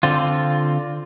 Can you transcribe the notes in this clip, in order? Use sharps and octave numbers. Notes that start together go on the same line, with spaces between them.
D3 C4 F4